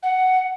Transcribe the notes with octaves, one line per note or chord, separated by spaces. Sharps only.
F#5